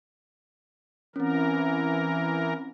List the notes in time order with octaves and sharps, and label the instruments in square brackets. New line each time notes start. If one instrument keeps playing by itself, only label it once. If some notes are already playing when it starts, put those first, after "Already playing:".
[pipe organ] E3 A#4 [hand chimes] C4 C#4